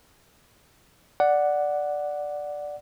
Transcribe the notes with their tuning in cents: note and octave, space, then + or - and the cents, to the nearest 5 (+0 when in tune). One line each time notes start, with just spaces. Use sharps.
D5 +0 F#5 +0